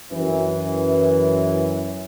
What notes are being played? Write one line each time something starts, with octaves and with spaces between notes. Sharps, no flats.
F#2 E3